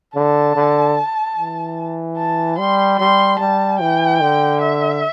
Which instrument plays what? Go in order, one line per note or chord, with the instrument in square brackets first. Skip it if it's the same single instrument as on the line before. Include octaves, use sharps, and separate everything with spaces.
[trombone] D3 [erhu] A5
[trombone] D3
E3
[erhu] A5
[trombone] G3 [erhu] C6
[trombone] G3 [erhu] C6
[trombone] G3 [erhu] A5
[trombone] E3 [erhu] G5
[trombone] D3
[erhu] E5